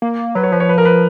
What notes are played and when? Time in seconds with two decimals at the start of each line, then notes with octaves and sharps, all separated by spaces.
0.02 A#3
0.35 F#3 B4
0.43 C#5
0.52 F3 B4
0.60 C#5
0.69 B4
0.78 A#4
0.85 B4